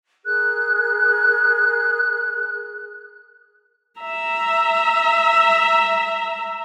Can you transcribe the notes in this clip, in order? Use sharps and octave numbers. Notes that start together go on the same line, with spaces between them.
G#4 A#4 F#6
E5 A#5